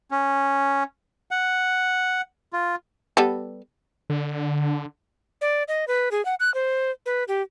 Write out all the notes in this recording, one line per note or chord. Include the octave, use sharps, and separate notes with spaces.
C#4
F#5
F4
G3 B3 A4
D3
D5
D#5
B4
G#4
F#5
F#6
C5
B4
G4